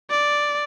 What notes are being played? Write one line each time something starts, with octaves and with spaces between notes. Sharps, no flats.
D5